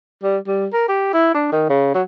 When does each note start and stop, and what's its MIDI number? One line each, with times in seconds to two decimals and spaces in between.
0.23 0.38 55
0.47 0.67 55
0.73 0.88 70
0.89 1.11 67
1.14 1.33 64
1.34 1.48 62
1.52 1.65 51
1.69 1.90 49
1.94 2.02 54